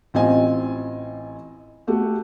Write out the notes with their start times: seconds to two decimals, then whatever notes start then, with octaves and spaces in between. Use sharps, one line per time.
0.14 A1 C4 F4 D#5 G#5
1.87 A3 F#4 G4